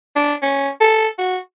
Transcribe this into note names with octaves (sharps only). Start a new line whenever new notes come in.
D4
C#4
A4
F#4